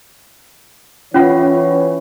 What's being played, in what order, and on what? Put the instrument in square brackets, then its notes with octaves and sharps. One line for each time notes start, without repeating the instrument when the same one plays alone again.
[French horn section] E3 C#5 [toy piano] C#4 F4 F#5